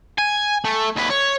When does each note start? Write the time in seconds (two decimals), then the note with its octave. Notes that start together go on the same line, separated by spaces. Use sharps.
0.18 G#5
0.65 A3
0.96 D#2 B4
1.10 C#5